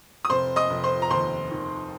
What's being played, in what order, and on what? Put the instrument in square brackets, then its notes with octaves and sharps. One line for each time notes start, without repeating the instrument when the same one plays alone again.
[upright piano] D#6
F1 C5 C6
D#5 D#6
F1
C5 C6
A#5
D#2 C5 C6
D#3